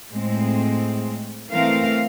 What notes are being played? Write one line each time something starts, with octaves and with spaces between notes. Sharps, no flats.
A2 G#3 C4
E3 A3 C4 A#4 F5